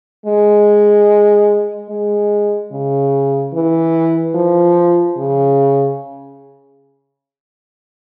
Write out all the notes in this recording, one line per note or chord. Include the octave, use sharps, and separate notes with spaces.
G#3
G#3
C#3
E3
F3
C#3